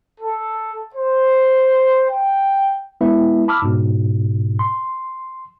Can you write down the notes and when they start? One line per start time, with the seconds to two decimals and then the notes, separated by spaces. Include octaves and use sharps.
0.21 A4
0.94 C5
2.09 G5
3.01 G#3 B3 E4 B4 E5
3.48 A5 B5 D6 E6 F6
3.62 G#2 B2
4.59 C6